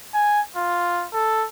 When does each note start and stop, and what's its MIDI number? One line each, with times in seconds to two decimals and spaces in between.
0.14 0.41 80
0.57 1.06 65
1.14 1.46 69